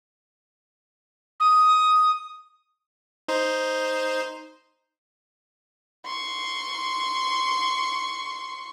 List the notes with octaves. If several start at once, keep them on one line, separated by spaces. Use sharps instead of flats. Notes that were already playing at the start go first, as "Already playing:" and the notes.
D#6
D#4 C5
C6 C#6